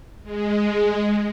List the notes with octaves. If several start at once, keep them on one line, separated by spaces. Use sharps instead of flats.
G#3